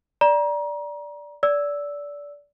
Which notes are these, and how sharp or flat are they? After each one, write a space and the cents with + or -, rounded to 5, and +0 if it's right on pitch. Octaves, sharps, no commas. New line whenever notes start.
D5 -5 A#5 +30
D5 -20 E6 +0